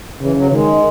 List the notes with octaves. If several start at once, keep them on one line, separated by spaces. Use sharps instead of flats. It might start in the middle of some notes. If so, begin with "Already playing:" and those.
C#3 E3
F#3
D#3 G#3